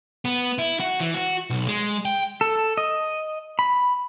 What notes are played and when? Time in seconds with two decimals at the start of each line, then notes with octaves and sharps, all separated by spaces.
0.25 B3
0.58 E4
0.80 F#4
1.00 E3
1.14 F#4
1.50 B1
1.68 G#3
2.05 G5
2.41 A4
2.77 D#5
3.59 B5